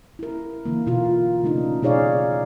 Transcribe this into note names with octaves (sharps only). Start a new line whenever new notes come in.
E4 A#4
D3 E3 A#3
B2 F4 A#4
C#3 A3 D4 D#4
B2 D#4 G#4 C#5 D5 F5